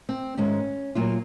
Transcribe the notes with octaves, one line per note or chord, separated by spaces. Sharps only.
C4
G#2 D#3 G#3 C#4
A#2 F#3 A#3 F4